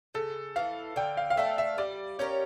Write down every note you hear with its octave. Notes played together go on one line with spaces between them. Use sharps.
C#3 A4
E3 A3 F5
D3 G5
F5
F5
A3 D4 A4 E5
E5
G3 D5
C#4 G4 A#4 C#5